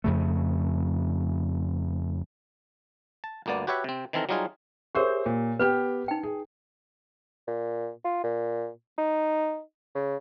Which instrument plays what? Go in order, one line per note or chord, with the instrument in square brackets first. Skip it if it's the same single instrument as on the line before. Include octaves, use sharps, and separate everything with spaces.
[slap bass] F2 C#3 A3
[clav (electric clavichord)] A5
G1 D2 A#3 B3 D5
F#4 G4 B4 C#5 E5 F#5
C3 C4
D#3 E3 C4 A4 A#4
F#3 G3 D#4 F4 G#4
[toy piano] G4 A#4 C#5 [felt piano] G#4 C5 E5
[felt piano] A#2
[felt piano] B3 G4 G5 [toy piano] B4
[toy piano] D#4 G5
[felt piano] G#4
[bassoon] A#2
F4
A#2
D#4
C#3